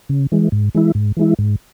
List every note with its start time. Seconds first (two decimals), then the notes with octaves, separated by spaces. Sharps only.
0.09 C#3
0.32 E3 G#3
0.52 G#2
0.75 E3 G#3 E4
0.95 G#2
1.17 E3 G#3 E4
1.39 G#2